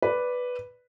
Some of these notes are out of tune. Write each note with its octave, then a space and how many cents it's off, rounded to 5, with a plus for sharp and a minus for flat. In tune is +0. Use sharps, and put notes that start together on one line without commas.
B4 +0 D5 -5